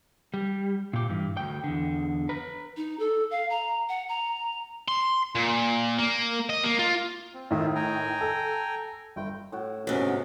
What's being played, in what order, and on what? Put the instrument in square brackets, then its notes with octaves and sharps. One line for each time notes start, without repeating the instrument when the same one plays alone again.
[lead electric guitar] G3
A#2 G4
G2 E3
D2 G5
E2 D3
B4 A#5
[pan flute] D#4
A4
F5
A#5
F#5
A#5
[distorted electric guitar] C6
A#2
A#3
D#5
A#3
F4
[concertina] C4
[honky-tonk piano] A2 D#3 [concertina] F4 A#4 E5
[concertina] G5 G#5 A#5
[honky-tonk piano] A4
[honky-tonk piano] G1 [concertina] G5
[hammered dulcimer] A2 F#4
[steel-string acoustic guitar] D2 G#2 [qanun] C3 B3 D6 [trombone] C#4